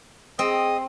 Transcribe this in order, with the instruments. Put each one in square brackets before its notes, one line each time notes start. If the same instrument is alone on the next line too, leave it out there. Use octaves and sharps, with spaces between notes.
[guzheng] C4 [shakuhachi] G#4 [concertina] D#5 D#6